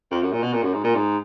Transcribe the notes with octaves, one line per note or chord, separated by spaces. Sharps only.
F2
F#2
A#2
B2
A#2
F#2
G#2
A#2
G#2